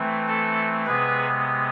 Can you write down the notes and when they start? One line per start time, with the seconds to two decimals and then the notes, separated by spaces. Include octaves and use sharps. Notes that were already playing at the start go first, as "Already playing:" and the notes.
Already playing: E3 A3 C4
0.28 A4
0.86 C3 G#3 B3 G#4 B4